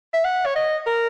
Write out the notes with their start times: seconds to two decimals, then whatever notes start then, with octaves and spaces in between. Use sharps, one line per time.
0.13 E5
0.24 F#5
0.46 C#5
0.55 D#5
0.86 A#4